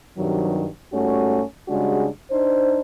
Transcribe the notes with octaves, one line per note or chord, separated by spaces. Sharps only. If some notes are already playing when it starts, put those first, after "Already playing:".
G2 C3 D#3 F#3
G#2 G3 A3 C#4 F#4
C#3 G3 G#3 D4 F#4
D4 D#4 C5